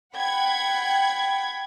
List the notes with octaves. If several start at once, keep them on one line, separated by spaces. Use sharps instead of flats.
F#5 G5 B5 G#6